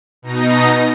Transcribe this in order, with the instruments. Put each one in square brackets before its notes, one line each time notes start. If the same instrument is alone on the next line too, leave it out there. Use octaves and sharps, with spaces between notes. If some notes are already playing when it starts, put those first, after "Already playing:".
[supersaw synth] B2 D#4 A#6